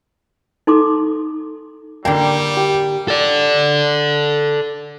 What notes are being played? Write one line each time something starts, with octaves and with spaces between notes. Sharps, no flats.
D#4 A4 A#5 C6 D6
D3 G3 A#3 G5
G4
A4 D5